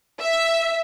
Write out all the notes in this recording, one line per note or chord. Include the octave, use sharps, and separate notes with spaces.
E5